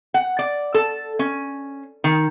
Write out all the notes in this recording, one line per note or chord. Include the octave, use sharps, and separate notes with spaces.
F#5
D5
A4
C#4
D#3